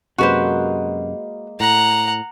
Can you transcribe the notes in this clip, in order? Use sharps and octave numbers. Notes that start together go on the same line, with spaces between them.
F#2 C3 G#3 A#3 F#4 B4 C5
A2 F#5 A#5